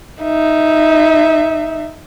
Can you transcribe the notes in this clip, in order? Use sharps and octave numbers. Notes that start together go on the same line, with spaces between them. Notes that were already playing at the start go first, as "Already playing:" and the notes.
D#4 E5